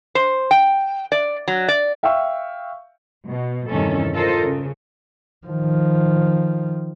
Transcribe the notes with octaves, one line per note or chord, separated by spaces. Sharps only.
C5
G5
D5
F#3
D5
E5 F5 G5 C#6 E6
B2
E2 G2 C3 D#3 C#4 A4
F4 A4 A#4 C5 D#5
C#3
D#3 F3